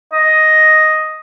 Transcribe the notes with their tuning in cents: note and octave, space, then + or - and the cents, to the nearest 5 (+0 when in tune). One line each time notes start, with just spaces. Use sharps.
D#5 +5